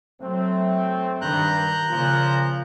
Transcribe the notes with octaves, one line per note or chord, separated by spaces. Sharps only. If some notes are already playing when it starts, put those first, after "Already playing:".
F#3 A3 C4
G2 D#3 A#5 F#6 G6
A#2 C#3 F3